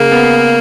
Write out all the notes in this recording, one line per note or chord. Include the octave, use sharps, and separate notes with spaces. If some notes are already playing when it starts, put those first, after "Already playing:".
Already playing: C#3 A#3
B3